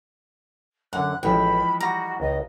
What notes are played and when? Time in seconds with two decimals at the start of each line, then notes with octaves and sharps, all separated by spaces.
0.93 F#2 D3 F#5 F#6
1.23 A1 E3 F3 G#3 G5 B5
1.80 G3 F#4 A#5
2.20 C#2 D#5